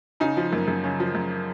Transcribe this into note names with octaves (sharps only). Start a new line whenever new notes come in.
C#3 D#4
F3
F#2 A#3
F#2
C#3
F3
F#2